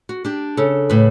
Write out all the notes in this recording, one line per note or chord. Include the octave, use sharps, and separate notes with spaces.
F#4
D4 G4
C#3 A4
A2 B4